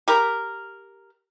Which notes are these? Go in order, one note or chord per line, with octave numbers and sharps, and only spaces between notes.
G4 A#4